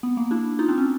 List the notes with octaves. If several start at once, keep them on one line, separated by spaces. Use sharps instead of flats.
B3
A#3
D4 E4
D#4 F4
C4 D4
C#4